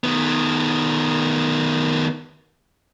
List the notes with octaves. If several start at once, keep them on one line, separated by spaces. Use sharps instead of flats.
D#3 B3